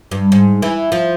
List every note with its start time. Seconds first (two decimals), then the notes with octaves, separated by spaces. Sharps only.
0.11 G2
0.32 G#2
0.62 E3
0.92 F3